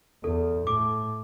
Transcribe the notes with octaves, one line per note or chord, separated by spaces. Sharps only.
E2 A4
A2 D6